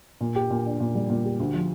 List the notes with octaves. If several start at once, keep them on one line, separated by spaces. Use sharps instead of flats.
A#2
G4
A#2
D4
A#2
G3
A#2
G4
D2
F3